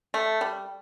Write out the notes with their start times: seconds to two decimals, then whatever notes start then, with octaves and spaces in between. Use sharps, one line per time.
0.14 A3
0.41 G3